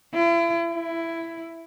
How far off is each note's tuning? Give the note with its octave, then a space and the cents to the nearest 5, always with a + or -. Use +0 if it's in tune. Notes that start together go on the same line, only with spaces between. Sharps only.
E4 +40
E4 +10